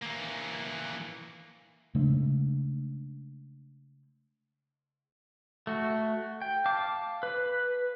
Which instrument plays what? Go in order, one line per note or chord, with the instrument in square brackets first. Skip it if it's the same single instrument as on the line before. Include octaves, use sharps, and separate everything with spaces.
[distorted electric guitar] E3 A#3
[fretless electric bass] C#3 G#3 A3 D4
[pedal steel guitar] A3 F#4
G5
F5 A5 D6
B4